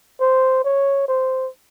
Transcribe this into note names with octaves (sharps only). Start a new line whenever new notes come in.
C5
C#5
C5